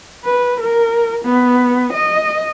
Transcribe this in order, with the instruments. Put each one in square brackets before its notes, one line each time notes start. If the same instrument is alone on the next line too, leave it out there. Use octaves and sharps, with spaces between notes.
[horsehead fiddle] B4
A#4
B3
D#5